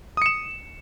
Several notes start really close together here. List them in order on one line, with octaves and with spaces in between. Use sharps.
D#6 C#7 E7